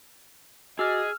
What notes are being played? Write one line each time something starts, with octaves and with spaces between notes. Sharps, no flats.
F#4 G#4 D#5 D6 E6 F6 A6